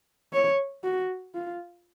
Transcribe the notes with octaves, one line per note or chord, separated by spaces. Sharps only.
C#5
F#4
F4